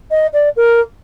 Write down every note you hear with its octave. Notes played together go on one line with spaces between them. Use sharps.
D#5
D5
A#4